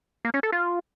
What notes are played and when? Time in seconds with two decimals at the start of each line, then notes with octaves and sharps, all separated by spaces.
0.25 A#3
0.34 C#4
0.43 A4
0.52 F4